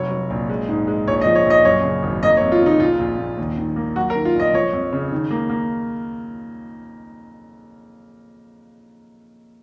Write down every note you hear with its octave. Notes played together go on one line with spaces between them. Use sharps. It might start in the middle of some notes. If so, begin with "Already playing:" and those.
Already playing: F1 F#3 C#5
F#3
A#1
G#3
G#2
G#3
A#1 C#5
D#5
F3
C#5
A#1 D#5
F#2 C#5
C#3
G#1
A#3 D#5
C#5
F2
F4
C#3 D#4
A#1 F4
A#1
A#2
D#2
D#3
A#3
F#3 F#4
A#4
D#3
F4
A#1 D#5
F3 C#5
F2
C#3
D#3
A#3
A#3